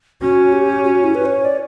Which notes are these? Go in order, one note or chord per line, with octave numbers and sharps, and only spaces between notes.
C#4 F#4
G4
F#4
E4
B4
C#5
D5